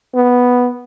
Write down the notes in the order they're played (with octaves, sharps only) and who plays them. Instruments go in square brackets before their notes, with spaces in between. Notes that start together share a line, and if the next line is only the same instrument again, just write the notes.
[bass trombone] B3